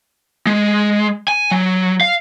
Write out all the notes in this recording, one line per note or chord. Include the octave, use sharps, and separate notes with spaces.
G#3
G#5
F#3
F5